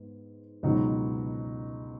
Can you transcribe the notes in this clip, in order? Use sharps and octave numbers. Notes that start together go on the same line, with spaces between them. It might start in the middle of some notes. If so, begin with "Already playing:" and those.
Already playing: G#2 B3
C#2 B2 F#3 D#4